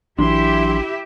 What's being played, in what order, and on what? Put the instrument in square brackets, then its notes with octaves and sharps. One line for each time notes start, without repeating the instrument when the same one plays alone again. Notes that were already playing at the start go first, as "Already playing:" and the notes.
[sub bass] A1 [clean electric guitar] E3 F#3 D4 [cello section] E4 G4 E5 [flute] C6